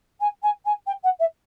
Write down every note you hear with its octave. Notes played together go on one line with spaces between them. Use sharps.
G#5
G#5
G#5
G5
F#5
E5